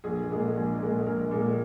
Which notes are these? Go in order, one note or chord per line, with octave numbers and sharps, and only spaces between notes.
A#1 G#4
A#2 G#3
A#1
A#2 G#3
A#1 A#4
A#2 G#3